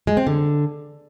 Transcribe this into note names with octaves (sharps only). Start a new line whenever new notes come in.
G#3
C4
D3